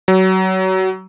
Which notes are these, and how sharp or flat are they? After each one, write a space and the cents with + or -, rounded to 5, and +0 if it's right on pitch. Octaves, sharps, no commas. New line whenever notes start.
F#3 +25